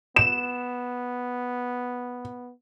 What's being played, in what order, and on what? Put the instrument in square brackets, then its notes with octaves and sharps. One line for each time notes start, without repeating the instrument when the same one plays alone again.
[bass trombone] B3 [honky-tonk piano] E7